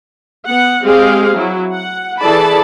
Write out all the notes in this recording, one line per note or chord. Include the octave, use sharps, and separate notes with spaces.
B3 F#5
G#3 C4 G4 G#4 F5
F#3 E4
F#5
E3 G#4 A4 D5 A5 B5